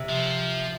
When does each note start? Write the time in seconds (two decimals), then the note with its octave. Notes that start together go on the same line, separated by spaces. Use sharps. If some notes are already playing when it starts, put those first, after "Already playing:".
Already playing: C3
0.09 F3